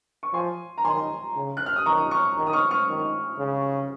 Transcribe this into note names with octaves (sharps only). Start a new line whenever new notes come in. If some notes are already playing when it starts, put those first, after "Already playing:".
C#6
F3 G#5 C6
A#5
D#3 G#5 C6
C#3
F#6
F6
D#6
D#3 A#5 C#6
C#6 F6
D#3
D#6
C#6 F6
C#6 F6
D#3
C#3